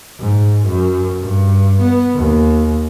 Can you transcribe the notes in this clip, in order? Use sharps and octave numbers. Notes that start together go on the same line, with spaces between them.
G#2
F#2
G2
B3
D#2